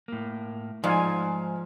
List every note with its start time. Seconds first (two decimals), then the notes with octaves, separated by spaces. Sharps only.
0.08 A2 A#3
0.84 G#2 F3 D5 F5 G#5